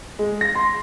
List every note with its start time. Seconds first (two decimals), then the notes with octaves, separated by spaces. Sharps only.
0.19 G#3
0.41 A#6
0.55 C6